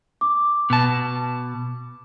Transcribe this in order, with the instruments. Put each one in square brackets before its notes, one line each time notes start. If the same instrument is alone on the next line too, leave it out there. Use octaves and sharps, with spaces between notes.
[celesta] D6
[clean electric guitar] B2 A5